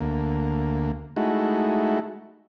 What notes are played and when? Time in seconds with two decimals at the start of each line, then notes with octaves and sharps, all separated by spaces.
0.01 D2 A#3
1.16 G#3 A3 D#4 E4 F#4